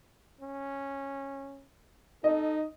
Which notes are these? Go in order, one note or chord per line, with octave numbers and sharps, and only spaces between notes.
C#4
D#4 A4 D#5